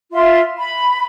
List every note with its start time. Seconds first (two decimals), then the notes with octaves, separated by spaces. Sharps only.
0.12 F4 E5 C6
0.56 B5